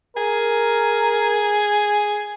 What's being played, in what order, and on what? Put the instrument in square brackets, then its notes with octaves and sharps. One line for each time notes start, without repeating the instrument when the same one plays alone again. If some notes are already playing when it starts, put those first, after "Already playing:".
[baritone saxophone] G#4 [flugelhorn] A#4